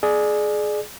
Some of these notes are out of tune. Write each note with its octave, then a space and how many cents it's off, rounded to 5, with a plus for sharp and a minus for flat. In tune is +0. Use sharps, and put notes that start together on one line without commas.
G#4 +25 D5 +25